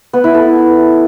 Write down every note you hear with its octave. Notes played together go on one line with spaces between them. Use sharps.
B3
E4
A4